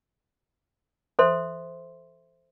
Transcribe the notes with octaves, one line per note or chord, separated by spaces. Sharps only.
A4 C5 E5 C6